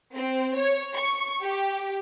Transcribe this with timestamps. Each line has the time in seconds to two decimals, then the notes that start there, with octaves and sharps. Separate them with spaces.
0.16 C4
0.56 C#5
0.95 C#6
1.43 G4